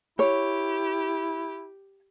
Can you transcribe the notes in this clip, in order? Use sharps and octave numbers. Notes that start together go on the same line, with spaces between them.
E4 G4 C#5